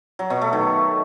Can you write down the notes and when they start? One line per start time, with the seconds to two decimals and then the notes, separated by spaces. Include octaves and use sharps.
0.19 F#3
0.30 B2
0.41 A3
0.53 D#3